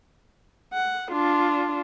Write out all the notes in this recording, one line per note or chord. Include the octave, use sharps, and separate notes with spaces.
F#5
D4 F4